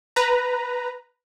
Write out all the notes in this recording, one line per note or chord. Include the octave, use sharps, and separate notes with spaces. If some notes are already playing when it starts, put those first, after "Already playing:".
B4 A#5